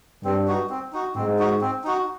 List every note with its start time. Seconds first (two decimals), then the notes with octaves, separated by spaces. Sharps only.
0.24 G2 C4
0.48 D#4 F#4
0.70 C4
0.93 D#4 F#4
1.15 G#2 C4
1.39 D#4 F#4
1.61 C4
1.84 D#4 F#4